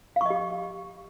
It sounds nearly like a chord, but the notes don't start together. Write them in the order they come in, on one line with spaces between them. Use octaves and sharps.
F5 C#6 D#5 G4